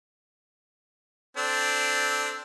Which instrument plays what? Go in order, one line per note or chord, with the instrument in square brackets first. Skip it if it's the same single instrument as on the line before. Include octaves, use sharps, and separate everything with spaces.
[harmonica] C4 D4 A4